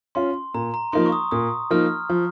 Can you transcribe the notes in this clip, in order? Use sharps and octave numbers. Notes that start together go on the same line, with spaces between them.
C#4 F4 C6
A#2 A#5
A#5
F3 A#3 D#4 C6
C#6
D#6
A#2 D#6
F3 A#3 D#4 F6
F3